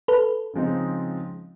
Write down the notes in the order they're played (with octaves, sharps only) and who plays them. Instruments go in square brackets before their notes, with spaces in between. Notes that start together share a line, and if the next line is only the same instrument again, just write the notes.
[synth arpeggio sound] A4 B4
[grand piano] C#3 F3 G#3 C4 D#4